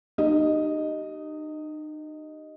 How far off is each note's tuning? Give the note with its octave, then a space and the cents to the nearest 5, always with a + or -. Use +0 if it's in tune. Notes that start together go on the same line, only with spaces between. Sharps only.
D#4 -35 G4 -30 D#5 +0